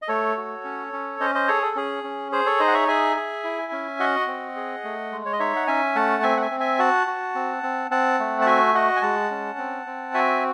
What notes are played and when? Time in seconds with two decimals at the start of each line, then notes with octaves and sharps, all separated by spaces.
0.02 D#5
0.08 A3 A4 C#5
0.37 F#4
0.65 C#4
0.93 C#4
1.20 C#4 C5 D#5
1.35 C5 D#5
1.48 G#4 A4 C#5
1.62 A4
1.76 C#4 G#4
2.04 C#4
2.32 G#4 C5
2.46 A4 C#5
2.60 D#4 C5 D#5
2.68 F#5
2.73 C#5 E5
2.88 G#4 E5 G#5
3.16 G#4
3.44 E4
3.72 C#4
4.00 F#4 D#5 F#5
4.27 C4
4.56 G#4
4.84 A3
5.12 G#3
5.25 C#5
5.33 D#5
5.39 D#4 C#5 E5
5.56 F#5
5.67 C#4 E5 G#5
5.95 A3 F#5 A5
6.23 C4 E5 G#5
6.37 F#5
6.42 E5 G#5
6.51 C4
6.60 E5 G#5
6.79 F#4 F#5 A5
7.07 F#4
7.35 C4
7.63 C4
7.90 C4 F#5 A5
8.19 A3
8.41 A5
8.46 F#4 E5 G#5
8.75 F#4 D#5 F#5
8.96 G#5
9.02 G#3 F#5 A5
9.31 C#4
9.58 C4
9.86 C4
10.14 F#4 E5 G#5